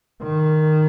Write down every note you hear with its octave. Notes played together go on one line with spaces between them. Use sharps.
D#3